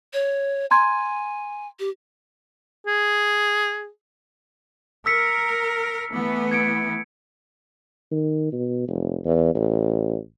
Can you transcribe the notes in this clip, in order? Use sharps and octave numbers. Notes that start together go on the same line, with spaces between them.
C#5
G#5 A#5 C6 G#6
G4
G#4
A#4 E6 B6 C#7
E3 A3 B3
G#6 C#7 D7
D#3
B2
F1
E2
A1